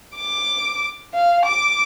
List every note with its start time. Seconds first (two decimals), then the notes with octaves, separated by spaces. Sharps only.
0.16 D6
1.14 F5
1.45 D6